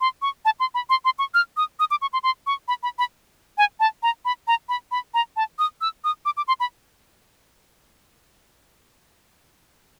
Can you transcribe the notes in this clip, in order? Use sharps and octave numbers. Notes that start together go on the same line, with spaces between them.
C6
C#6
A5
C6
B5
C6
C6
C#6
F6
D#6
D#6
D6
C#6
C6
C6
C#6
B5
B5
B5
G#5
A5
A#5
B5
A#5
B5
B5
A#5
A5
D#6
E6
D#6
D6
D6
C6
B5